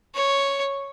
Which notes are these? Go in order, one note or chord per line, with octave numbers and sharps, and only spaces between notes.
C#5